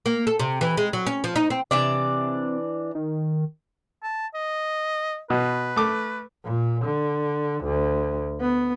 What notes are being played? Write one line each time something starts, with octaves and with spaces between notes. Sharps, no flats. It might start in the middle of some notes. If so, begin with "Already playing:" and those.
A#3
A4
C3
E3
G#3
F#3
C#4
F3
D#4
C4
C3 E3 D4 D5
D#3
A5
D#5
B2 B4
A3 D6
A#2
D3
D2
B3